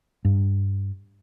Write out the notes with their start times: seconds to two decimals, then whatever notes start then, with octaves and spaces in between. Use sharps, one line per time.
0.25 G2